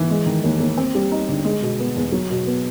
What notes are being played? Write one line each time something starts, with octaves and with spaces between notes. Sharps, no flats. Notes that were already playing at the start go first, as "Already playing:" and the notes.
Already playing: E3
G#3
D#3
D#2
D#2
C4
G3
D#4
D3
G#3
B2
B3
E2
F#3
B2
B3